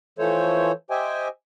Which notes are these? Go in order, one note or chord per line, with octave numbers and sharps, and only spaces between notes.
E3 F3 A3 A4 C5 C#5
G4 C5 D#5 E5 G5 G#5